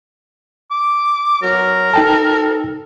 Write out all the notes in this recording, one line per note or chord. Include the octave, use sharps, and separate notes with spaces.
D6
F#3 A#4
D#4 A4 G5 A5